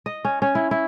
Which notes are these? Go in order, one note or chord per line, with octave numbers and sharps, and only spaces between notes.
D#5
C#4
C#4
E4
E4